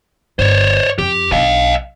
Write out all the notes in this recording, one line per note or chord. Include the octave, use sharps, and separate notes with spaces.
G1 C5 C#5
F2 G4
B1 D4 D#5 F5